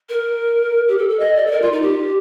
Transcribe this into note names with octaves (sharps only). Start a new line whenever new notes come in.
A#4
G4
A4
A4
D#5
D5
A4
A#4
F4
D#4
G4